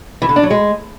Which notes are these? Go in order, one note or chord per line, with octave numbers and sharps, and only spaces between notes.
E3
D3
D4
F#3
G#3